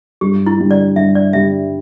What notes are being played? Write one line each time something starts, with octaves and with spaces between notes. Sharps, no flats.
G2 G4
E4
D3 G3
D5
G2 E5
D5
D3 G3 E5